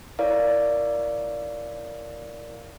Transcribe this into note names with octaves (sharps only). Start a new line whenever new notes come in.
E4 A#4 C#5 D5 F5